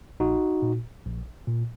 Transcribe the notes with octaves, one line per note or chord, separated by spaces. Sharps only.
A#1 D#4 F#4
A#2
A#1
A#2